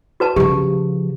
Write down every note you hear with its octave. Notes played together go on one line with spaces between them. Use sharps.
F#4 B4 A5
C#3 F3 G4